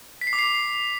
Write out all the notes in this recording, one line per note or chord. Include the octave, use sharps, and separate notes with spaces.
B6
C7
D6
C7